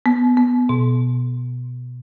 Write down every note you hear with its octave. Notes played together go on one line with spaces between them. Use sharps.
B3
B3
B2